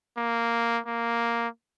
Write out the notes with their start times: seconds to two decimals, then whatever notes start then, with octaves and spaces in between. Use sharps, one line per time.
0.18 A#3
0.86 A#3